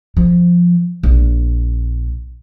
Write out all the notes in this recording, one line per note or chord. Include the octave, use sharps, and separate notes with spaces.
F3
A#1